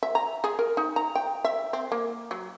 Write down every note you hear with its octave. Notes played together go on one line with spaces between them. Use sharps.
E5
A#5
G#4
A#4
D#4
A#5
G5
E5
C4
A#3
F#3